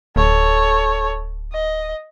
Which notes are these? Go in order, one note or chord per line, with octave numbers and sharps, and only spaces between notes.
D1 A4 C#5
D#5